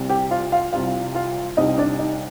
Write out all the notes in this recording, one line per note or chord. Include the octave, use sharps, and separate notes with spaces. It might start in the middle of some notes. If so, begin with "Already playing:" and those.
Already playing: C2 C3 G3
G4 G5
F4 F5
F4 F5
C2 C3 G3 F4 F5
F4 F5
C2 C3 G3 D#4 D#5
D4 D5
D#4